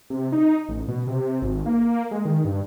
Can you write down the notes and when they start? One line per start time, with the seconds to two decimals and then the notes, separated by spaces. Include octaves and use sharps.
0.10 C3
0.32 D#4
0.69 A1
0.88 B2
1.07 C3
1.42 G#1
1.66 A#3
2.11 G#3
2.25 D#3
2.45 G2